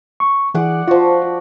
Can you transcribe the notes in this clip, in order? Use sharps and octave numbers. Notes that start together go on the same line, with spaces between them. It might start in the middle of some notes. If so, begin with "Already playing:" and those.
C#6
E3 G#4 D5 F#5 D6
F3 F4 F#4 C5